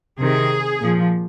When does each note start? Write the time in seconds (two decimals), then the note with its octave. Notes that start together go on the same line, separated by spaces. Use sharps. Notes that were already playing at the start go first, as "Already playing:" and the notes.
0.19 C3 D#3 G#4
0.80 A#2 F3